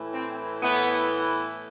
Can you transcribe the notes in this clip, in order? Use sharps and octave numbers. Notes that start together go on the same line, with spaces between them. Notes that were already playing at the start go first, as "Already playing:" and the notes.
Already playing: A2 E3
C4
A2 E3 B3